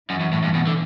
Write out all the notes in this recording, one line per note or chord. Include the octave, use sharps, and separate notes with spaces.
F#2 E3
F#2
A2
G2
B2
D3